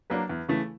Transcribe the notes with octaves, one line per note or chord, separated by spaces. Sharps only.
F#3 A#3 D4 B4
E2
C#3 E3 A3